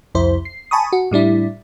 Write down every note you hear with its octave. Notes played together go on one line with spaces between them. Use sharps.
C2 F2 E4 C5
C7
G#5 A5 B5 C#6 D#6
F#4
A2 G3 D4 E4